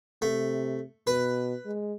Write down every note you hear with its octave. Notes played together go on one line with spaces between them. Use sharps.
C3 A3
B2 B4
G#3